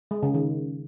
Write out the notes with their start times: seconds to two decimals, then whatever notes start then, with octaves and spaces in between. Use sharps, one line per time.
0.11 G#3
0.23 C#3
0.34 D#3